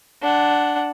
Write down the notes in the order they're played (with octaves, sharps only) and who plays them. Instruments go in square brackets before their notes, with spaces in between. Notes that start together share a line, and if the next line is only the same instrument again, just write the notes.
[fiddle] D4 F#5